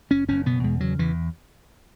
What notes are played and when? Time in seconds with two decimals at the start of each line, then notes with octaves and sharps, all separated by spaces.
0.10 F#1 C#4
0.28 F#1 C#4
0.46 B2 B3
0.64 E2 G#3
0.80 C#3 F#3
0.99 E2 E3